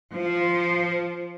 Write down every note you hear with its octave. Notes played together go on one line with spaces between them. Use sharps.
F3